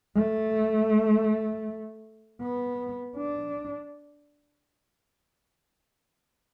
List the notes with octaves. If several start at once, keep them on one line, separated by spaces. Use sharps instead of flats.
A3
B3
D4